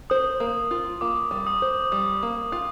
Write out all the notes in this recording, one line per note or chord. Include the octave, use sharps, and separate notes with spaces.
C5 D#6
A#3
F4
A#3 D6
G3
D#6
C5
G3
A#3
F4